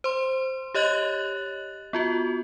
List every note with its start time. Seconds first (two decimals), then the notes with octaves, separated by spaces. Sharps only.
0.04 C5 C6
0.74 G4 C#5 D#5 F#6 A6 F#7
1.93 B3 F4 F#4